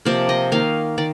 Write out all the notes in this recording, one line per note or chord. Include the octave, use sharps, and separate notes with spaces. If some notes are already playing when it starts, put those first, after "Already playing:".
C3 F3 A#3 D5
D#5
D#3 A#3 F5
D#3 D5